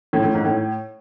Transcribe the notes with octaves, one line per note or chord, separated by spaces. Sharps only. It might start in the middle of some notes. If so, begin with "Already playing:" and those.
A2
A2
G#2
A2